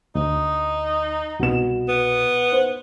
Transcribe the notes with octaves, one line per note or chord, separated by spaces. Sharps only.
D2 D#4
C2 B2 F#4 E7
B3
C5